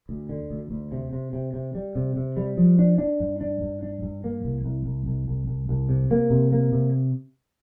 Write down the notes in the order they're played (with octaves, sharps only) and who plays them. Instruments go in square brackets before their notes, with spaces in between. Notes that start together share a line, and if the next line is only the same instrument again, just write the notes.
[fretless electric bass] D2
D3
D2
D2
C3
C3
C3
C3
G3
C3
C3
G3
F3
D4
D4
G2
D4
G2
D4
G2
A#3
C2
C2
C2
C2
C2
C2
C2
C3
A#3
C3
A#3
C3